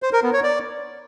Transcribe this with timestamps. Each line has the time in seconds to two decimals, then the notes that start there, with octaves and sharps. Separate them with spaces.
0.03 C5
0.13 A#4
0.23 B3
0.33 C#5
0.43 D5